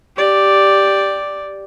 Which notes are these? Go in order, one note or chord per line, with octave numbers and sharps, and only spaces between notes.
G4 D5